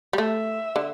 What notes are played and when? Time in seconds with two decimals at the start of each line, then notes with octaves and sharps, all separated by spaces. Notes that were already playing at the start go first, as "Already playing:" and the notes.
0.13 G3
0.18 A3 E5
0.76 D3